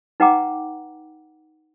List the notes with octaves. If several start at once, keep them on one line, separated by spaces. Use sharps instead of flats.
D#4 B4 F#5 G5 A#5 D6